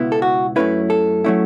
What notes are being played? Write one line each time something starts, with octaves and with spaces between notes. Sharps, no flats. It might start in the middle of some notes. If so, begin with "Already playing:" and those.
Already playing: C#2 B2 B3 E4
A4
F#4
F#2 F#3 A3 C#4 E4 B4
A4
F#3 A3 C#4 E4